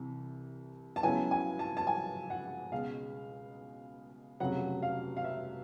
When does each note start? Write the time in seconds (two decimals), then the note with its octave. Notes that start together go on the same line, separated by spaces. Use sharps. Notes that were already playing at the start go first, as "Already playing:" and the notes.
Already playing: C2 C3 E3
0.96 A5
1.03 C#2 C#3 F#3 B3 E4 G#5
1.31 G#5
1.59 A5
1.77 A5
1.87 G#5
2.30 F#5
2.71 C#2 B2 G#3 F5
4.40 F1 F2 C#3 F#3 F#5
4.82 F5
5.17 F5
5.24 E5